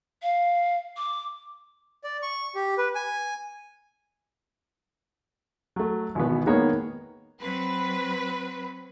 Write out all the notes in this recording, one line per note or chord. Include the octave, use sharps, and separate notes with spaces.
F5
D6
D5
C#6
G4
B4
G#5
F#3 A3
G#1 B2 E3 B3
D#3 G#3 A#3 B3 C#5
F#3 C4 B4